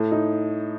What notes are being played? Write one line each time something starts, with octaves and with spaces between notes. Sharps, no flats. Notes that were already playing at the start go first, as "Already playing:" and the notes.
Already playing: A2
D#4